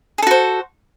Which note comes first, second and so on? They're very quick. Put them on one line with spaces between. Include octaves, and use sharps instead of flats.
G#4 A4 F#4 C5